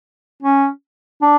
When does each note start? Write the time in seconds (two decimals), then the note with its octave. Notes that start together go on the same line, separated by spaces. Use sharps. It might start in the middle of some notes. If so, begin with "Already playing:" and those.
0.43 C#4
1.22 D4